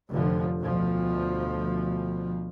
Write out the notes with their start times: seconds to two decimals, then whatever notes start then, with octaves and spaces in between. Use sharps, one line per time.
0.11 F1 D3 F3
0.61 D2 B2 F3